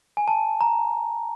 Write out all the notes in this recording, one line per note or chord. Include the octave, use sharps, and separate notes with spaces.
G#5
A5
A#5